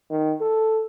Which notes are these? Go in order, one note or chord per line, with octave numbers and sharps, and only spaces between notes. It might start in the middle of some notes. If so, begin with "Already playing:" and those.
D#3
A4